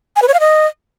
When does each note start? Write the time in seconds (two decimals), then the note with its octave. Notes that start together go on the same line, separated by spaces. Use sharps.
0.16 G#5
0.22 B4
0.28 C#5
0.34 F5
0.40 D#5